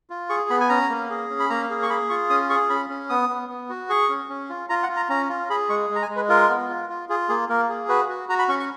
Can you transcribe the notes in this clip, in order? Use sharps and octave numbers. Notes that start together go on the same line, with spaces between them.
F4
G#4 C#6
B3 B5
G#5
C#4 A#5
A#3
G#4
C#4
B5
A#3 A#5
G#4
C#6
G#4 B5
F4 C#6
C#4 D#6
G#4 C#6
C#4 B5
C#4
B3 D#6
B3
B3
F#4
G#4 C#6
C#4
C#4
F4
F4 A#5
F#5
F4
A#5
C#4 A#5
F4
G#4 B5
G#3 C#6
G#3
A#5
G#5
G#3
B4
F4 A#4
B3
F4
F4
F4 G#4
A#3 G#4
A#3 A#4
G#4
F#4 B4
F#4
F#4 A#5
B5
C#4 C#6
C#6